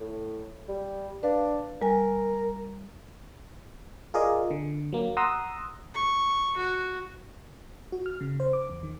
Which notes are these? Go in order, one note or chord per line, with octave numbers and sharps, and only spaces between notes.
A2
G3
D4 B4 F5
G3 A#4 G#5
F4 G#4 A#4 D5 D#5
D3
F#3 A#3
F#5 A#5 C6 D#6 E6
C#6
F#4
F#4
F6
C#3
C5
D6
E2
D#3